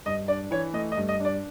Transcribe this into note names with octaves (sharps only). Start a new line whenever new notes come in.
G2 D#5
D4 D5
E3 C#5
A3 D#5
D#5
G2
D#5
D4 D5